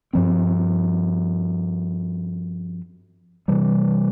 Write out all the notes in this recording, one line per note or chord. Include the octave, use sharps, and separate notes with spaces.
G2 F3 C4
C3 E3 G3